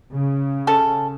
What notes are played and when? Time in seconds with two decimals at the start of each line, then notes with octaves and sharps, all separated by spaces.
0.13 C#3
0.67 C#4 A4